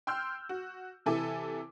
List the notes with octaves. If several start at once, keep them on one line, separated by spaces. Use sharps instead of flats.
G5 C6 E6 F6 G6
F#4
C3 E3 E4 A4 G#5 D6